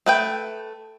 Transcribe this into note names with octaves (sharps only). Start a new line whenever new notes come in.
A3 B4 G5